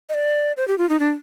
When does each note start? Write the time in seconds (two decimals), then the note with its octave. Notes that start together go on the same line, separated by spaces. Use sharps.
0.09 D#5
0.14 D5
0.57 C5
0.68 G4
0.78 F4
0.89 D#4
1.00 D4